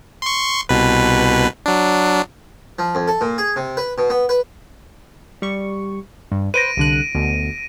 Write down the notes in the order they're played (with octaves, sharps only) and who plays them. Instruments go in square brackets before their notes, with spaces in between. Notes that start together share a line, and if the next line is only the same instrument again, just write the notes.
[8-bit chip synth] C6 C#6
C2 B2 B4
F#3 D4
[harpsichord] F3
F2
A4
A#2
G#4
C3
B4
B2
B3
B4
[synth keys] G3 C#6
G2
[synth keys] B4 C5 [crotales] A#6 D7 D#7
[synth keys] C2 D3 F#6
D2 B2